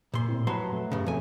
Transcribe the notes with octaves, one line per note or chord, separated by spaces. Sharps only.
A#2 C6
A2 C4 E4
F2 F#3 B4 A5 B5 C6
A3 B4
G2 C#3
B1 F2 A3 G#5